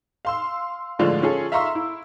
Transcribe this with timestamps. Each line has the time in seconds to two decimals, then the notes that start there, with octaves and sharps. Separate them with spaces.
0.25 F5 C6 E6
0.99 A2 D3 F3 G#3 D4 F4
1.22 C#4 F4 G#4 A4
1.52 E5 F5 A#5 C6 C#6 E6
1.75 E4